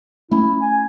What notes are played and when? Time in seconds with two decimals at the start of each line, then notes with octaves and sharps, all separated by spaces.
0.31 A3 C#4 E4
0.61 G#5